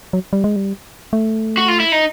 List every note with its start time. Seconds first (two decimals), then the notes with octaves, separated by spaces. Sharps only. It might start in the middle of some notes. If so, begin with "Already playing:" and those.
0.13 F#3
0.33 G3
0.44 G#3
0.56 G3
1.13 A3
1.57 F#4
1.68 F4
1.80 E4
1.92 D#4